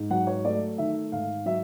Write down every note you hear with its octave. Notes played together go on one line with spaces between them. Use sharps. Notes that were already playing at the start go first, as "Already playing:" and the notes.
Already playing: G#2
F#3 F#5
C#5
A3 D5
D#3 E5
G#2 F5
F#3 E5